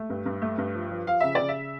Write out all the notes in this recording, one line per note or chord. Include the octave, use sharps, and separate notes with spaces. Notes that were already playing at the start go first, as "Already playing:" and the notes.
Already playing: A3
G2
G2
A3
G2
F3
F3
F3 F5
C#3 E5
C#3 D5
E5